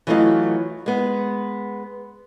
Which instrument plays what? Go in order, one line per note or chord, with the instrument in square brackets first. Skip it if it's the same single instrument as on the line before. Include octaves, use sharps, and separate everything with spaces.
[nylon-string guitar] E3 F#3 A3 D4 F4 D#5
G#3 B3